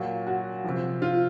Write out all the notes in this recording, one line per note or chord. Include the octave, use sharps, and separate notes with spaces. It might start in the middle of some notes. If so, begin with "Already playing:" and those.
Already playing: A#2 F#3
F#4
C3 F3
F4